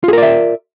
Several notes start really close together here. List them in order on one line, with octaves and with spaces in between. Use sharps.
F4 G#4 A#4 D5 E5